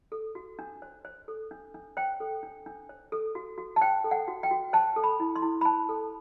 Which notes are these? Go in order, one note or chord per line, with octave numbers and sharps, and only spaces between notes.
A4
F#4
D4
C5
C5
A4
D4
D4
C5 G5
A4
D4
D4
C5
A4
F#4
F#4
A5
C5 G5
A4
F#5
F#4
G5
F#4
C5 A5
A4
B5
E4
C6
E4
B5
C5 A5
A4